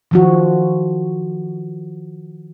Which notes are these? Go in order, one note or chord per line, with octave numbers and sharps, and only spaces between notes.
D#3 F3 F#4